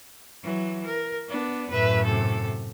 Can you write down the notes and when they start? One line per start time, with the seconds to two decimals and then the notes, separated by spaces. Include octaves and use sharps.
0.43 E3 F#3
0.85 A#4
1.28 B3 D4
1.70 F#2 A2 B4 E5
2.05 C3 A4